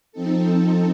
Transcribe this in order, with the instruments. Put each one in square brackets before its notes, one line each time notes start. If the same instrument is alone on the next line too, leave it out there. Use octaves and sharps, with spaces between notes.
[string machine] F3 C4 D#4 A4